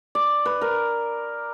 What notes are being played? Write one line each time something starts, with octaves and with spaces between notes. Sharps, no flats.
D5
B4
A#4